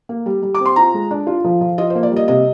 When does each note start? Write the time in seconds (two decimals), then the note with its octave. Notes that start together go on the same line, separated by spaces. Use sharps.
0.09 A#3
0.26 G3
0.43 G3
0.55 D6
0.60 C4
0.66 C6
0.76 F4 A#5
0.94 G#3
1.11 D4
1.27 F4
1.44 F3
1.61 F3
1.78 F4 D#5
1.90 C5
1.95 A#3
2.03 D5
2.11 G3
2.16 D#5
2.28 C3 D#5